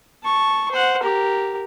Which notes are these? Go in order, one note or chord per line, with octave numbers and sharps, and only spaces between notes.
A5 C#6
C5 F#5
G4 A#4